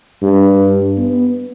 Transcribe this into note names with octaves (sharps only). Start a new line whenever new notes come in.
G2
B3